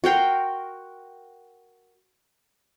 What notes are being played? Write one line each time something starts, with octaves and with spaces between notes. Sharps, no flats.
F#4 A#4 G5 C6